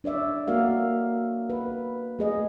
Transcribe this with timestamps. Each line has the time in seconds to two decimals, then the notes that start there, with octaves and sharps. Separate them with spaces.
0.04 D4 C#5 D5 E5
0.48 A#3 F#4 A#4 F5
1.50 B4
2.19 A3 G#4 D#5